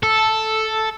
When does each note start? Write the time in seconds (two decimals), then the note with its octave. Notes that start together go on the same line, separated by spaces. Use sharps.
0.03 A4